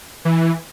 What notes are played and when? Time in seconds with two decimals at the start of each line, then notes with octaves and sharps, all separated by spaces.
0.25 E3